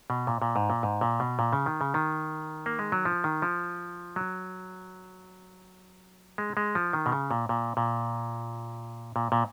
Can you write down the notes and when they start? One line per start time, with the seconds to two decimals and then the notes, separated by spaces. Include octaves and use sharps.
0.10 B2
0.27 A#2
0.42 A#2
0.56 G#2
0.70 A#2
0.83 G#2
1.01 A#2
1.20 B2
1.39 A#2
1.53 C#3
1.66 D#3
1.81 C#3
1.94 D#3
2.66 A#3
2.79 G#3
2.92 F#3
3.05 F3
3.24 D#3
3.42 F3
4.16 F#3
6.38 G#3
6.57 G#3
6.75 F3
6.93 D#3
7.06 B2
7.12 C#3
7.31 A#2
7.49 A#2
7.77 A#2
9.16 A#2
9.32 A#2